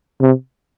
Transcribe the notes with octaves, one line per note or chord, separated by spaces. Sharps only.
C3